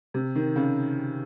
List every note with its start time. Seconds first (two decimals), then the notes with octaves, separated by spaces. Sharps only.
0.14 C3
0.35 D#3
0.56 C#3